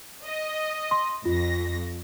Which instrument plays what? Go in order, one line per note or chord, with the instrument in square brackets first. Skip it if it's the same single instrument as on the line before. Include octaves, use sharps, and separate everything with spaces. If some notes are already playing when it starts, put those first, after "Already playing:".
[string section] D#5
[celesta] C6
[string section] F2 A#6 [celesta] F4